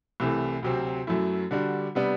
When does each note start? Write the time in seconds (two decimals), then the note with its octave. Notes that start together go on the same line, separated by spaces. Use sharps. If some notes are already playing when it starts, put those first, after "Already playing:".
0.20 C2 C3 E3 A3
0.62 D2 C3 F#3 C4
1.07 F#2 F#3 A3 E4
1.51 D3 G3 D4 F#4
1.95 C3 G3 B3 D4